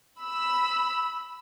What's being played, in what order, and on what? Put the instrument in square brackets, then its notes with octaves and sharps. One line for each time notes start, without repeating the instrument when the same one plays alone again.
[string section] B5 E6